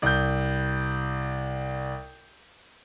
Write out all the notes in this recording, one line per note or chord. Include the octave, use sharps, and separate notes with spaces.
C2 G6